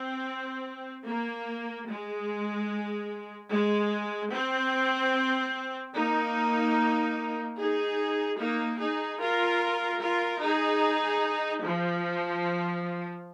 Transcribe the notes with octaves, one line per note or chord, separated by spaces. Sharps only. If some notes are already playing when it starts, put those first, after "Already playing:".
Already playing: C4
A#3
G#3
G#3
C4
A#3 D#4
D#4 G#4
A#3 D#4
D#4 G#4
F4 A#4
F4 A#4
D#4 G#4
F3